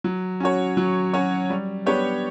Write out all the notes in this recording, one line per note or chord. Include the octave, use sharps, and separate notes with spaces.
F#3
C#4 F#4 C#5
F#3
C#4 F#4 C#5
G3
B3 D4 G4 C#5